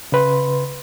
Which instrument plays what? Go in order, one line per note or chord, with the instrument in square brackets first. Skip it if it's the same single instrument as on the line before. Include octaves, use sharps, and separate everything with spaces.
[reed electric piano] C#3 B4 C6